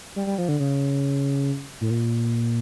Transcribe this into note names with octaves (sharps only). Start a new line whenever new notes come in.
G3
G3
F3
D3
C#3
A2
A#2